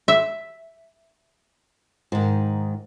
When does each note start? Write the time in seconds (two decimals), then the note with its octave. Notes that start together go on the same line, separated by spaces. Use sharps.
0.08 E5
2.12 G#2 D#3